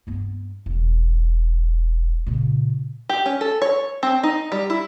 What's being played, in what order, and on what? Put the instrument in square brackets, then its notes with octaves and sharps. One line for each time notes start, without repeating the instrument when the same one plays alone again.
[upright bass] G2 B3
E1
A#2 C#3
[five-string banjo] G4
C#4
A4
C#5
C4
D#4
G3
E4